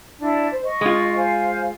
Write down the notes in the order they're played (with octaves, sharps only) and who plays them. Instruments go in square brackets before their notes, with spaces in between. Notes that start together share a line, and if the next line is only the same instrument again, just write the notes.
[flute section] D4 E4 D5
C5
D#5 C#6
[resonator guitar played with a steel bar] G#3 F4
[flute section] C5 F5 G#5